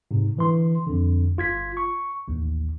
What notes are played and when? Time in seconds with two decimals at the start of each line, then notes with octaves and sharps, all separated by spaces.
0.11 G#2 C3
0.36 D3 E3 C6
0.87 F2 D3
1.37 G1 F4 G#6 B6
1.77 C#6
2.28 A1 D#2